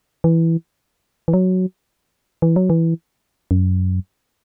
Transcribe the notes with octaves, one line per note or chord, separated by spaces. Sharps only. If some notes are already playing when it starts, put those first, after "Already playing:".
E3
E3
F#3
E3
F#3
E3
F#2